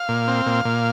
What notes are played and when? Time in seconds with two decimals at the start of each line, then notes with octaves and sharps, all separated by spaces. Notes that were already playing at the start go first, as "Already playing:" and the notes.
Already playing: F5
0.09 A#2
0.28 C4
0.46 A#2
0.65 A#2